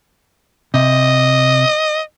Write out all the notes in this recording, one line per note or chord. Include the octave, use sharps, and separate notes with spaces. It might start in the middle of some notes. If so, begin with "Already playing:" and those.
C3 D#5